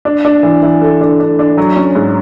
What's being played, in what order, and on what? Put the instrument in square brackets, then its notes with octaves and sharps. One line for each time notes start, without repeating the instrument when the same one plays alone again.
[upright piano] D4
D4
E3
E3
A4
D4
D4
D4
F#3
C#4
G#2